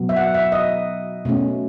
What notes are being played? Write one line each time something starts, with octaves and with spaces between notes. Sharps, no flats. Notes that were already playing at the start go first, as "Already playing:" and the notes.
Already playing: B2 F#3 B3
E5
F#5
E5
D#5
B2 A3 C#4